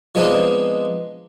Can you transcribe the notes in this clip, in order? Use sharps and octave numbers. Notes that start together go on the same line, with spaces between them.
F3 G#3 B3 C4 D4 D#4